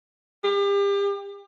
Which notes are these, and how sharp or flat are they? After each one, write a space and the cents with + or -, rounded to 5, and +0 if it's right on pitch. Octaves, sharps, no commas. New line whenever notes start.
G4 +35